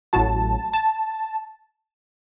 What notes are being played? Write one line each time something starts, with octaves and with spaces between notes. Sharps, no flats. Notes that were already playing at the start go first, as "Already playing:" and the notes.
A1 A2 F#3 A5
A5